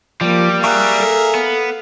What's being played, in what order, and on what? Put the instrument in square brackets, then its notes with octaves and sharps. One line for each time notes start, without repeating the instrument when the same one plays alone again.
[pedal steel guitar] F3 [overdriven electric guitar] G3 [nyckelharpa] A#3 D6
[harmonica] G#4 A#4 E5 [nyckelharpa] F5 [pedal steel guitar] C#6 D#6 F#6
[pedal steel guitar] A4
[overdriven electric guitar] B3